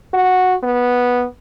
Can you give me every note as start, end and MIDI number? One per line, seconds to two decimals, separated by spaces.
0.13 0.55 66
0.63 1.24 59